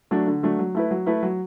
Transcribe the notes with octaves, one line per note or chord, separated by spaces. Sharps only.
F#3 A3 D4
D3
F#3 A3 D4
F#3
A3 E4 B4
F#3
A3 E4 B4
F#3